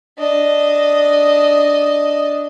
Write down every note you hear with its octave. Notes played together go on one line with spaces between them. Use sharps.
D4 D#5